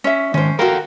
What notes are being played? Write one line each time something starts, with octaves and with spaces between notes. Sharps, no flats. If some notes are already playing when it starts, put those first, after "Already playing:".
C#4 E5
D#3 G#3 C#4 C5
F#4 A4 A#4 F5 G5